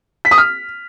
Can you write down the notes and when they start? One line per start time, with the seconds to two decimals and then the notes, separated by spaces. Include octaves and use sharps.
0.25 B6
0.31 D#6
0.38 F6